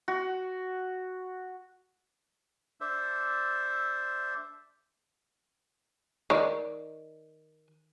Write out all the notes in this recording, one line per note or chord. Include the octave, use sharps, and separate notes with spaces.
F#4
D4 A4 C5 E5
D#3 D5